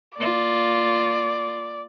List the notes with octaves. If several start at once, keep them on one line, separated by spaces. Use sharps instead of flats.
A#3 F4 D5